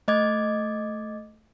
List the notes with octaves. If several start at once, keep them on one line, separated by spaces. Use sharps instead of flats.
A3 D#5 D6 G#6